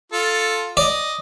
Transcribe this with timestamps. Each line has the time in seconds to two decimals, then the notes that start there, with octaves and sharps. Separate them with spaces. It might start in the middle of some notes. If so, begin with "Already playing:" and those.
0.12 F4 A4
0.77 D5 D#5